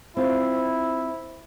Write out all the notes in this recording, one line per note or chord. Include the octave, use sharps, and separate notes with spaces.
C4 E4 F4 C5